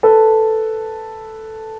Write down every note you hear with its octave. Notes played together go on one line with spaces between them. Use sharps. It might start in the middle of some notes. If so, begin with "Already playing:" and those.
A4 B4